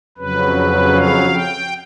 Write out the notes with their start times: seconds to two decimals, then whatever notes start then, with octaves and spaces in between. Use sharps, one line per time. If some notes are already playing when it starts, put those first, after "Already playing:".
0.17 F2 C#3 F#3 B4
0.96 F5
1.33 G5